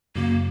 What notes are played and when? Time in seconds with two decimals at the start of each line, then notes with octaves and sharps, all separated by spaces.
0.16 F#2 C#3 F#3 A#3